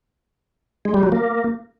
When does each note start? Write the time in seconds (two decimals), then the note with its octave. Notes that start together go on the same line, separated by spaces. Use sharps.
0.85 G#3
0.94 G3
1.03 F#3
1.12 A#3